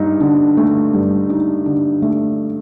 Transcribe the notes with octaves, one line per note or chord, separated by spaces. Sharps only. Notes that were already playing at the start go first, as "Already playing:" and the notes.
Already playing: G2 D#4
D3
A3
G2
D#4
D3
A3